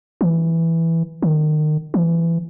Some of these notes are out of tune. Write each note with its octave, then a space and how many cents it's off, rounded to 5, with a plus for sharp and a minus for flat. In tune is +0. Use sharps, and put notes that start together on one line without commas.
E3 +0
D#3 -30
E3 +20